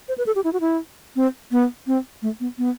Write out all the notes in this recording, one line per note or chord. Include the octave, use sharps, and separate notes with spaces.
C5
B4
A4
G4
E4
F#4
E4
C4
B3
C4
A3
B3
B3